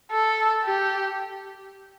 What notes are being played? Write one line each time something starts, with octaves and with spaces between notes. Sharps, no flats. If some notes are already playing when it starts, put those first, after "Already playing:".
A4
G4